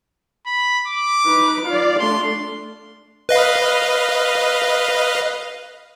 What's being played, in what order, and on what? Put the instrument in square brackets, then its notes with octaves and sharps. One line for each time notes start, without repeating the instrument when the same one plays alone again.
[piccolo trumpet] B5
D6
[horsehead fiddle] D#4 B4
[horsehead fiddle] F4 D5 [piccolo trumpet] F5
[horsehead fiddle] A3 D4 [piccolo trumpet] C6
[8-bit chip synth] B4 D#5 F5